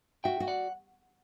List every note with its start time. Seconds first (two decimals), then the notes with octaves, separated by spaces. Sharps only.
0.24 F#4 E5 G5
0.40 F#4
0.47 D5 F#5